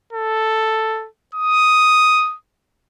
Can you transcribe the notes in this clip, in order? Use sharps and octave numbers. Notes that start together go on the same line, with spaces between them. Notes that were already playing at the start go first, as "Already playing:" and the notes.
A4
D#6